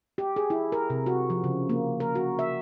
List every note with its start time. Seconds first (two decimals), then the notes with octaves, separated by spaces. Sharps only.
0.18 G4
0.36 G#4
0.50 E4
0.72 A#4
0.90 C3
1.06 F#4
1.30 F3
1.44 C#3
1.69 A#3
2.00 A#4
2.15 F#4
2.39 E5